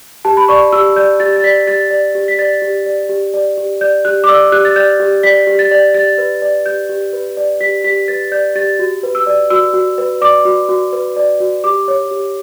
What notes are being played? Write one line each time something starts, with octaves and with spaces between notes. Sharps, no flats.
G4 A5
B5
D5 C#6
G4 E6
D5 G6
G4 A6
A6
D5 B6
G4 A6
D5
G4
B6
D5 A6
G4
D5
G4
D5
G4
D5 G6
G4 F#6
D6
D5 E6
G4 F#6
A6
D5 G6
G4
D5 B6
G4
A6
D5
G4 A6
B4
D5
G4 G6
G4
B4
D5
G4 B6
G4 B6
B4 A6
D5 G6
G4 A6
F#4
B4
E6
D5
F#4 E6
F#4
B4
D5 D6
F#4
F#4
B4
D5
F#4
G4 D6
C#5
G4